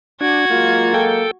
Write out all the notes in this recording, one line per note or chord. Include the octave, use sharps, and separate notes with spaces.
D4 F#4 G#6
F#3 G#3 A#3 F4
A4 G5